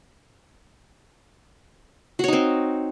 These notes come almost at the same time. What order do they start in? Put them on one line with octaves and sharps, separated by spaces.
F#4 C#5 D#4 C4